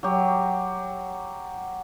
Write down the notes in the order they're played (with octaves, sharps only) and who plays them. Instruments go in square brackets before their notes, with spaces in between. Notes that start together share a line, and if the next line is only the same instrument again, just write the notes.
[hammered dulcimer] F#3 G4